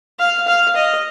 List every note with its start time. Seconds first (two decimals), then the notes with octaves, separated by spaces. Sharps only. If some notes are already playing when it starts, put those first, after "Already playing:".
0.20 F5
0.48 F5
0.76 D#5